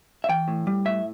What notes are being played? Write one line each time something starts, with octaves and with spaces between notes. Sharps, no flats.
E5
E3 G5
A2
G3
A2 E5